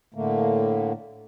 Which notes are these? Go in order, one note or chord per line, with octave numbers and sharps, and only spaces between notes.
A2 D3 A3 A#3